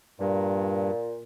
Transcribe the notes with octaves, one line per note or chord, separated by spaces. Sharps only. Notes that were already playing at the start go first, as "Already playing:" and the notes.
G2 A#2